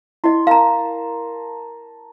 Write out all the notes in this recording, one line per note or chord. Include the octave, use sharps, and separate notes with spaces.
E4 D#5 C6
A#4 F5 A5 A#5